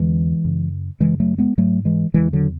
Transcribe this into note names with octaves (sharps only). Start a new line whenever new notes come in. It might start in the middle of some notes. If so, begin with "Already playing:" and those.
Already playing: E2 D3 E3 G#3
F#2 C#3
F#2 C#3 E3 G#3
F#3 A3
G#3 B3
G#2 F#3 A3
E3 G#3
E2 C#3 E3 G#3
D3 F#3